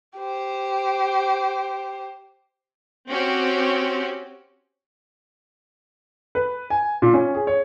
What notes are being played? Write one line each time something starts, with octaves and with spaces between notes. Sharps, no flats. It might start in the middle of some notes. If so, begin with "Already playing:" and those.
G4 C5
C4 C#4 F#4 G4
B4
G#5
A#2
C#4
G#4
C#5